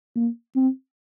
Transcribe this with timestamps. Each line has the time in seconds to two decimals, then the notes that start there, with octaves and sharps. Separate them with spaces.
0.16 A#3
0.56 C4